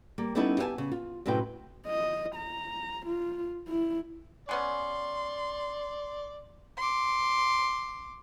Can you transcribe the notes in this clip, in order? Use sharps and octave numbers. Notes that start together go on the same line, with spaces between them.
G3 A#3
G3 B3 C#4 D#4 E4 A4
G4 E5 F5 G#5 A5
C#3
F4
F#2 A2 C3 E4 B4 G5
D#5
A#5
F4
E4
G#3 B3 C#4 D5 C6
C6 D6